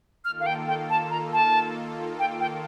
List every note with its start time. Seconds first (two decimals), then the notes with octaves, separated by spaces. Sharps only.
0.25 D#3 A#3 F4 A4 F6
0.40 F5
0.46 G5
0.68 G5
0.90 A5
1.11 A#5
1.33 A5
2.19 G5
2.40 G5